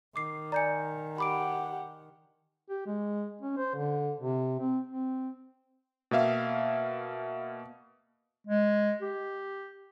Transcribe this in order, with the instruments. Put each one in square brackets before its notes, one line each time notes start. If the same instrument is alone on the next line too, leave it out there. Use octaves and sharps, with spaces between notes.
[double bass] D#3 [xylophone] D6 C7
[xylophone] D5 G6 C#7 [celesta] G#5 A#5
[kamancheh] G4 F#5 [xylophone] B5 D6 D7
[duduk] G4
G#3
C#4
C5
D3
C3
C4
C4
[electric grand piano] B2 A#3 E5 F5
[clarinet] G#3
G4